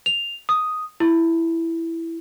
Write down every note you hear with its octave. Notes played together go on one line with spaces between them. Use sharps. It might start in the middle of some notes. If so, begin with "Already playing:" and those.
F7
D#6
E4